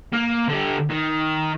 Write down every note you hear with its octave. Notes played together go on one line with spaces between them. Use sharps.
A#3
D3 G4
D#3